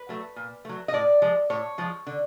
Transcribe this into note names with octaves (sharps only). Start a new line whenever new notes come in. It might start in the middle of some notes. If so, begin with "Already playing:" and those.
Already playing: B4
F#3 A3
A#2
F#3 A3
D#5
A2 D5
F3 G#3
A2 C#5
F3 G#3
D3